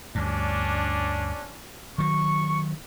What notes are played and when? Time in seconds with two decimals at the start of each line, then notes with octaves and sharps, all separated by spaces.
0.15 D2 G2 C#4 D4
1.98 D#3 F#3 C#6